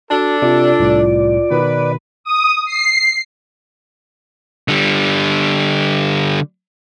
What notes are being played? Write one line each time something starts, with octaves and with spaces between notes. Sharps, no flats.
D4 F#4 A4 A5
C3 F4 D5
C2 A2
B2 D#3 B4
D#6
C7
D3 G3